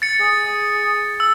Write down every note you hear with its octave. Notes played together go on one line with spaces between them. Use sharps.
A6 C#7
G#4
E6